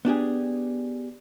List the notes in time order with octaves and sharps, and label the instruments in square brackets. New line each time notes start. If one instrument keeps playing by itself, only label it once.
[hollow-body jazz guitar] B3 D4 G4 G#4